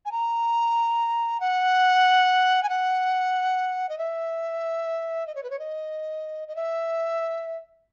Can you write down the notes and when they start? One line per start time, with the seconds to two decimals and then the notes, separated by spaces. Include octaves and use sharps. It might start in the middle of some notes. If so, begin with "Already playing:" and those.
0.05 G#5
0.12 A#5
1.40 F#5
2.63 G#5
2.69 F#5
3.89 D#5
3.98 E5
5.27 D#5
5.35 C#5
5.43 B4
5.50 C#5
5.59 D#5
6.48 D#5
6.56 E5